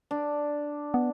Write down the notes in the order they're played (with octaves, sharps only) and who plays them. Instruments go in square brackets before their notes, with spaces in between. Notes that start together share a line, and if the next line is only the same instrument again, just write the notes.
[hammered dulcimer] D4
[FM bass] B3